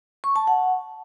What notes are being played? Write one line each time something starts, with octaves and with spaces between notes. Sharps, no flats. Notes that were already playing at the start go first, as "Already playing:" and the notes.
C#6
A5
F#5